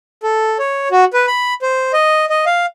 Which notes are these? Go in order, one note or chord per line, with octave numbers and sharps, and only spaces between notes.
A4
C#5
F#4
B4
B5
C5
D#5
D#5
F5